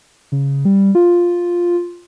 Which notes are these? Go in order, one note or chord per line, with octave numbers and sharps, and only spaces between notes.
C#3
G3
F4